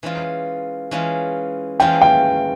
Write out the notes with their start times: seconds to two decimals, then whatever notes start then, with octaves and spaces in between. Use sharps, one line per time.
0.03 E3 G#3 C#4 F4
0.91 E3 G#3 C#4 F4
1.80 E3 G#3 C#4 F4 G5
2.02 G5